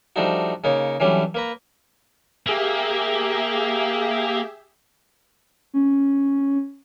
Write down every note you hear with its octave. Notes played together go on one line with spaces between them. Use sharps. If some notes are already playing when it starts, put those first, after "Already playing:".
F3 G3 A3 D4 D#4 F#4
C#3 A#3 D#4 C#5
E3 F#3 G3 A3 C#4 D4
A#3 B4 A#5
A#3 G4 G#4 E5
C#4